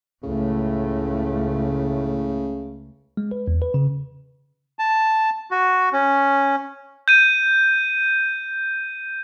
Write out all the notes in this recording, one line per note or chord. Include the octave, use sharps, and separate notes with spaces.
C#2 A2 C#3 A3
G#3
B4
E2
B4
C#3
A5
F#4
C#4
G6 D#7